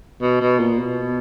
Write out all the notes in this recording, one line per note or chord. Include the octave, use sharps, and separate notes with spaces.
B2
B2
A#2
B2